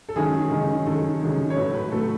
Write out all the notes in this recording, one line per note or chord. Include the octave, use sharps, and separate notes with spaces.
A4
F#2 D#3 G#3 C#4 G#4
F#2 D#3 G#3 C#4
F#2 D#3 G#3 C#4 A4
F#2 D#3 G#3 C#4
C#5
A2 F#3 A3 B4
B4
A2 F#3 A3 A4